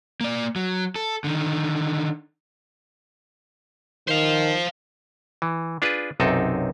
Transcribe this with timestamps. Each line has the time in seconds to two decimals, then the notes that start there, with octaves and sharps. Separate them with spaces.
0.21 A#3 D5
0.56 F#3
0.96 A4
1.24 D3 D#3
4.08 D#3 C5 F5
5.42 E3
5.82 D4 F4 G#4 B4
6.20 B1 F#2 C3 C4 D#4 A4